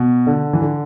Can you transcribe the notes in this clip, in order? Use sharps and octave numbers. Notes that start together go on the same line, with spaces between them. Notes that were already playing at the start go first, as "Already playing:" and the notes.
Already playing: B2
D3
E3
D3